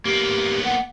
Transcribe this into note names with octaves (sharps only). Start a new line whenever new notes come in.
A#3 B3 G4
F#5